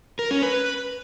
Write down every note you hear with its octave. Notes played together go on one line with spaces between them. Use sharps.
A#4
C#4
B4